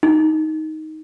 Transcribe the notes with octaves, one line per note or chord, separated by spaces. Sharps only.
D#4